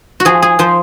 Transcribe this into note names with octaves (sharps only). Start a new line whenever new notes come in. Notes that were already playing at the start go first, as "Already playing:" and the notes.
F#4
F3 G#4
G#4
F3 C5